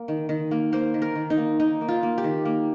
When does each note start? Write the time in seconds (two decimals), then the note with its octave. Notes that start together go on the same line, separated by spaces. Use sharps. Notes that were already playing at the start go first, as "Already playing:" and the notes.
Already playing: A#3
0.08 D#3
0.29 D#3
0.51 A#3
0.72 A#3 C5
0.94 D#3
1.02 A#4
1.16 D#3
1.30 D#4
1.37 A#3
1.60 A#3 D#4
1.81 A#3
1.88 F4
2.03 A#3
2.18 G4
2.24 D#3
2.45 A#3